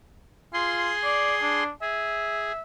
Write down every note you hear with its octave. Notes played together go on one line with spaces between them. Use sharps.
F4 G#4 C6
D5
D4
G#4 E5